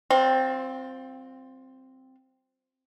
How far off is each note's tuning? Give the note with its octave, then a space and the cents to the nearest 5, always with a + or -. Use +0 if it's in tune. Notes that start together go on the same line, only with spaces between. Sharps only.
G3 -45 C4 +0 F4 +30